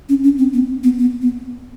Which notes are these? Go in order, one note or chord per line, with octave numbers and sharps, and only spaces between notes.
C#4
C#4
C4
B3
B3
B3
B3